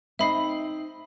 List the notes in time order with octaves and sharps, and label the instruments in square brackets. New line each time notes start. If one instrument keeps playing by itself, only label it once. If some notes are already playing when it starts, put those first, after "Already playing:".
[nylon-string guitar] C4 D#4 D#5 [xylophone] E5 B5 C7